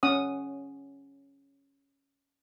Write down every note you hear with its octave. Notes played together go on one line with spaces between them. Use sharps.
C#4 F#5 D#6